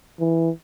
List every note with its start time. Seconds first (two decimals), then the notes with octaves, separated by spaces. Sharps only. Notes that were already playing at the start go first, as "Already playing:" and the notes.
0.20 E3